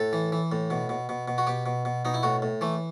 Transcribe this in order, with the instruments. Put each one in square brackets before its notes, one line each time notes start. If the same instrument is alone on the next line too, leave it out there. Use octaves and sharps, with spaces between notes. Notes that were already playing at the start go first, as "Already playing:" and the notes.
Already playing: [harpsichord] A2 A4
E3
E3
A2
B2
B2
B2
B2
F#4
B2 G4
B2
B2
B2 D#4
E4
A2 F#4
A2
E3 A3